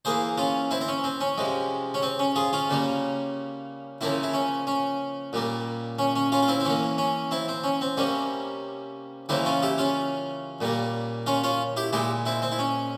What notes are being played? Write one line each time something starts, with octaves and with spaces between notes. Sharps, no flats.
E3 A#3 G#4 C5
C#4 F4
C4 E4
C4
C#4
C4
C#4
C3 F3 G#3
C#4
C4
C#4
F4 G#4
C#4 F4
C#3 G3 A#3
C#3 F3 A#3 C4 E4
E4
C#4
C#4
A#2 G3 A#3
C#4
C#4
C#4 F4
F4
C4 E4
C4
E3 A#3 C#4
C#4
C4 E4
C4
C#4
C4
C3 G3 A#3 C#4
C#3 E3 G3 A#3 C4 E4
C#4 F4
E4 G4
C#4 F4
A#2 G3 A#3
C#4 F4
C#4 F4
E4 G4
A#2 G#3 E4 G4
C4 E4
C4
E4
C#4